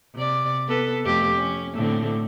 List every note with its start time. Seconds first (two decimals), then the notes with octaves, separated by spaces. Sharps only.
0.15 C3 D5
0.67 B3 A4 B4
1.05 F2 A3 G4
1.36 C#4
1.75 A2 D3 C4